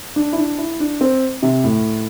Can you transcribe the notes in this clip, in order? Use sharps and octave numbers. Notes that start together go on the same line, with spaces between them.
D4
E4
D4
E4
D4
C4
C3
A2